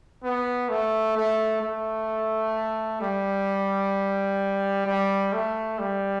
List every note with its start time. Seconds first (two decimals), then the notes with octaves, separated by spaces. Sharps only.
0.24 B3
0.70 A3
1.16 A3
1.62 A3
3.01 G3
4.86 G3
5.33 A3
5.79 G3